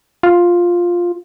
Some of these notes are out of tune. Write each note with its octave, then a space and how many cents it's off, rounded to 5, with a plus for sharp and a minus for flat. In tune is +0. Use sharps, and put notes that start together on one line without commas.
F4 +5